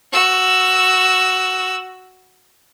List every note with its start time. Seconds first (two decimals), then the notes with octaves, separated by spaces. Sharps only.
0.12 F#4 E6